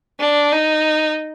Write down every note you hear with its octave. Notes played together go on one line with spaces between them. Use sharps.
D4
D#4